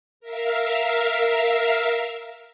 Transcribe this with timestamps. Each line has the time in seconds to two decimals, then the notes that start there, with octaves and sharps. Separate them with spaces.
0.20 A#4 E5 F5